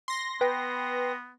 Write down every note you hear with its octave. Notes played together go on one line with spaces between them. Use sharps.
C6 A#6
B3 B4 G5